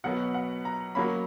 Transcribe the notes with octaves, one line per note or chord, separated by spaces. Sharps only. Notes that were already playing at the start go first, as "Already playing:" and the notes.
B2 F#3 B3 F#5
F#5
A#5
F#3 A#3 C#4 B5